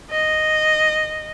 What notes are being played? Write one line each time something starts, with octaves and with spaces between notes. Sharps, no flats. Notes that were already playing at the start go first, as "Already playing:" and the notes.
D#5